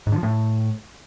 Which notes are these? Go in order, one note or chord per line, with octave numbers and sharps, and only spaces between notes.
G#2
D3
F3
A2